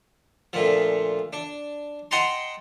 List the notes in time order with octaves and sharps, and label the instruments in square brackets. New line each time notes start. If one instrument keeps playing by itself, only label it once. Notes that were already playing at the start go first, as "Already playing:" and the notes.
[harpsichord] D2 A#2 F3
D4
D#5 F#5 G5 A5 A#5 C6